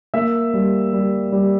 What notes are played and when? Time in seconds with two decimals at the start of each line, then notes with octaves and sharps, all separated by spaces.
0.14 A#3 E5
0.53 G3
0.93 G3
1.32 G3